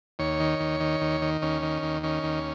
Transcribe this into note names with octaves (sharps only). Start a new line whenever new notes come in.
D#2 C#5
D#3
D#2
D#3
D#2
D#3
D#2 C#4
D#3
D#2
D#3 C#4
D#2